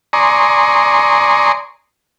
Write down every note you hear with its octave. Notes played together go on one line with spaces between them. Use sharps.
D5 G#5 A#5 C6 C#6 D#6